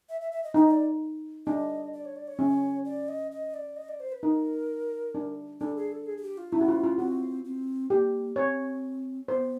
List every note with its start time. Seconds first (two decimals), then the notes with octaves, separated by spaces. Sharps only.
0.09 E5
0.21 E5
0.32 E5
0.43 D#5
0.54 D#4 D#5
0.71 D5
1.46 D4 D#5
1.93 D5
2.05 C#5
2.16 D5
2.27 C#5
2.39 C#4
2.85 D5
3.08 D#5
3.31 D#5
3.54 D5
3.76 D#5
3.88 D5
4.00 C5
4.12 B4
4.23 D#4 A#4
5.15 D4
5.60 D4 A4
5.76 G#4
5.92 A4
6.06 G#4
6.17 G#4
6.22 G4
6.37 F4
6.52 C#4 E4
6.61 F#4
6.68 F4
6.84 F4
6.98 C4 F#4
7.45 C4
7.90 A#3 G4
8.36 C4 C#5
9.28 B3 C5